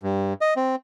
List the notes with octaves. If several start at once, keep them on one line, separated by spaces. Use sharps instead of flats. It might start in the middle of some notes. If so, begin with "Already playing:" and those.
G2
D#5
C4